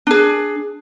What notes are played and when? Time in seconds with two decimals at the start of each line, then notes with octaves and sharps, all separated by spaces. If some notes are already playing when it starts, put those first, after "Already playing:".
0.07 D4 G#4